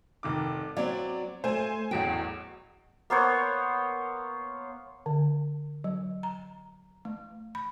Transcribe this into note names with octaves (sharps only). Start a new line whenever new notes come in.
F1 D#3 D6
F#3 C4 D5
A3 C5 G#5
A1 E2 F#3 G5
A#3 B3 C5 C#5
D3
F#3
A#5
A3
B5